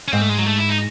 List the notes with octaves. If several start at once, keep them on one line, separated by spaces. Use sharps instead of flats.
C#4
G#2 C4
A3
G#3
F#3
A3
E4
D#4